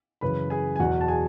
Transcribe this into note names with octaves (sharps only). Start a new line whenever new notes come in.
F#2 C#3 E3 B4 B5
G#4 G#5
G#5
E2 B2 F#3 F#4 F#5
A5
G#4 G#5